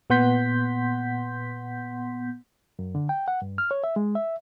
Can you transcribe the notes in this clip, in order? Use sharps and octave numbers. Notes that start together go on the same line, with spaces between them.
A#2 B3 F#5 C6 G6 B6
F#2
D3
G5
F#5
G2
F6
C#5
E5
G#3
E5